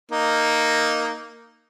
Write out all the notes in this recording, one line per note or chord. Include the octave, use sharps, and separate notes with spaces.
A#3 D#4